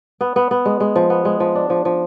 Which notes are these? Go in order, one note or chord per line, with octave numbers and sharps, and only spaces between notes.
B3
B3
B3
G#3
G#3
F3
B3
G#3
F3
D4
F3
F3